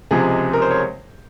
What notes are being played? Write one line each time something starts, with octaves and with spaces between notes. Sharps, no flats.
C#2 C3 F3 G#3 G#4
A#4
C5
C#5